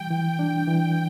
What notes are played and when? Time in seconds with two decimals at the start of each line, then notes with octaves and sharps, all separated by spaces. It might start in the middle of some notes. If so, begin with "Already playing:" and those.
Already playing: E3 G3 G5
0.10 E3
0.39 D4
0.67 E3